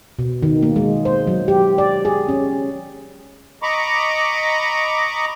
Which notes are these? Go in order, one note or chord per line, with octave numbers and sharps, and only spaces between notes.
B2
D#3
A#3
G#3
C5
F#3
G4
D5
G#4
C#4
D#5 A#5 B5 C#6 D6